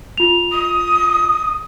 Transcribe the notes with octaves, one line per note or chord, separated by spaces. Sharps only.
F4 F7
D#6